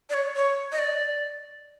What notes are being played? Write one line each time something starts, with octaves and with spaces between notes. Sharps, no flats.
D5
C#5
C#5
D#5
D5